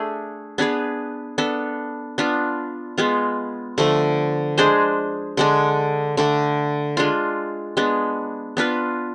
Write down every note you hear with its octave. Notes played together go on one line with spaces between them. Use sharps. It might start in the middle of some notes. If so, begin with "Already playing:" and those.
Already playing: A3 D4 G#4
B3 D4 G#4 B4
B3 D4 A4
B3 D4 F4
G#3 B3 F4
D3 F3 A3
G#3 D4 G#4 C5
D3 G#3 D4
D3 A3 D4
G#3 D4 F4
G#3 B3 D4
B3 D4 F4 B4